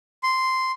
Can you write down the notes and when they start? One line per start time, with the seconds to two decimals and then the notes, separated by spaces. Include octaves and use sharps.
0.23 C6